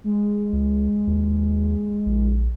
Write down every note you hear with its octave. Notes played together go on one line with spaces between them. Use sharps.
G#3
C#2
D#2
A#1